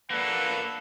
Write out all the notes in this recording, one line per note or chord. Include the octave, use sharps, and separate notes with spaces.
A#3 D4 A4 B4 F#5